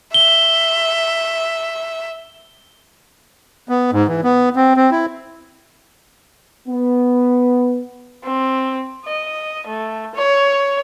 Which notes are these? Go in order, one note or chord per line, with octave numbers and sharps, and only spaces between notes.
E5 G7
B3
G#2
E3
B3
C4
C4
E4
B3
C4
D#5
A3
C#5